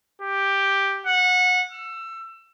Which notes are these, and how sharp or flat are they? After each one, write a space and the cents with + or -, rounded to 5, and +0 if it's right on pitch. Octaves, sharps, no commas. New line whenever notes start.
G4 +5
F#5 -20
E6 +25